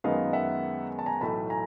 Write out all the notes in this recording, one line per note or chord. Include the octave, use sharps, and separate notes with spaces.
F#2 D#3 G#3 B3 D#5 F5
E5 F#5
A5
G#5 A#5
B1 A2 E3 A3 A5 B5
G#5 A#5